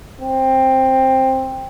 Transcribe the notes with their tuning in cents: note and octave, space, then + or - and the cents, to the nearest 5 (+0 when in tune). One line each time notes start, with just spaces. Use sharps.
C4 +10